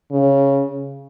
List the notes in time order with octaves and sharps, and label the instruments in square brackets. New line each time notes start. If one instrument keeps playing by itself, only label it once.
[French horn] C#3